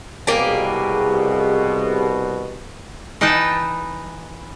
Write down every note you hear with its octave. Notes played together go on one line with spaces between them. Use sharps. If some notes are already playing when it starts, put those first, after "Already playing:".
C2 B2 A#3 G4 G#4
E3 D#4 B4 G5 A5